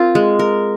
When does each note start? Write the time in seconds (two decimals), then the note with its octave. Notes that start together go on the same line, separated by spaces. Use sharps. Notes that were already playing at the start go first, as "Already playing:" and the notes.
Already playing: C4 F4 A#4
0.15 G#3
0.39 A#4